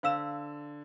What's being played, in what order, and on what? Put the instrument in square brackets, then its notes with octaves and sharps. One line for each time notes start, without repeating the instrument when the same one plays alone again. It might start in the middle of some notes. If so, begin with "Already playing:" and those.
[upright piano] D3 E7 [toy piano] C5 F5 E6